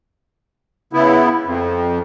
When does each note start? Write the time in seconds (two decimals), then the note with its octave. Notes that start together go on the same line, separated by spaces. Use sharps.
0.93 C#3 B3 E4
1.45 F2